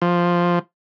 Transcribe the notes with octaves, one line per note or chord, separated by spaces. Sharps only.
F3